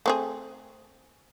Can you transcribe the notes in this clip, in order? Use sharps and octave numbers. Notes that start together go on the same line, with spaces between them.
A3 C4 G#4